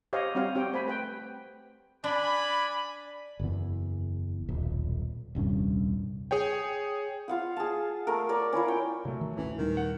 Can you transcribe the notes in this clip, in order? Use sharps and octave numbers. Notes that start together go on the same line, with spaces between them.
G4 C5 C#5 D#5 F5
G3 C4 D4 F#4 C#5 F5
C4 F#4 G4 C#5 G5
A3 C5 G#5 B5
A3 B4 G5
D4 D5 G#5 B5
F#1 E2
D#1 B1
D#1 C2 G2 C#4
G#4 C#5 G5
F4 F5 F#5
G#4 A5
A3 A#4
A#4 C#5 D5
C#4 E4 F4 C#5
G5
C3 F#3 A3
D#3 E3
D1 A1 E3 C#4
D#2 A#2 D#3 G3
F#5